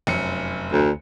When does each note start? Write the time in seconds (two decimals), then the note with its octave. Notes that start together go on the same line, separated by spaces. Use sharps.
0.07 F1 F#2 C#7
0.72 D2